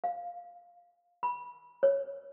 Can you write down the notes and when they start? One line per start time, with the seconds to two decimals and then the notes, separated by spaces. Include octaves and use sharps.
0.04 F5
1.23 B5
1.83 C#5